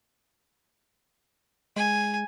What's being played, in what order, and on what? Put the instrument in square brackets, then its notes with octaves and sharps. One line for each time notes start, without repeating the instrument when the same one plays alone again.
[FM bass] G#3 [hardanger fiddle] G#5